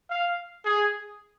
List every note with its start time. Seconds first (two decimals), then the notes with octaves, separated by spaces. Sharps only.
0.10 F5
0.65 G#4